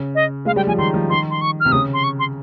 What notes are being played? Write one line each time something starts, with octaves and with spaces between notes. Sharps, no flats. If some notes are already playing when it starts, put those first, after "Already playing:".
Already playing: C#3
D#5
G#3 F5
G3 G5
F3 G#5
D#3 C6
F3
D#3 C6
C6
C#6
F6
C3
C#3 D#6
C6
C#6
C6